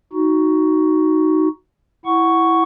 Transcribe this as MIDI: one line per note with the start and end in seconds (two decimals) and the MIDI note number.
0.13 1.48 63
0.13 1.48 66
2.05 2.63 64
2.05 2.63 78
2.05 2.63 85